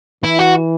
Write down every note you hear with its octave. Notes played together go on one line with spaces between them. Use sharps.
E3 E4
F#4